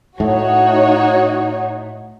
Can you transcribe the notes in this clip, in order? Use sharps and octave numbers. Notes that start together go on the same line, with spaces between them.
A2 D#4 F#4 C#5